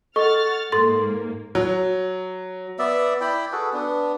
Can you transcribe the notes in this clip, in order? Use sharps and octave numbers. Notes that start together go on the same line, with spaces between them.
A4 D#5 F#5 C#6 F6 A6
G#2 A#3 A4 C6 A6
F#3
B3 D5 E5
E4 D5 G5 B5
F#4 G#4 A4 B4
B3 D4